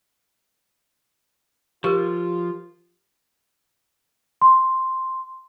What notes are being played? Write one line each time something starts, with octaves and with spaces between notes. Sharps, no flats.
F3 F4 G4 A#4
C6